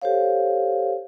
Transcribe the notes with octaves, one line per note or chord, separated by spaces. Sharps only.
G4 A4 C5 C#5 F5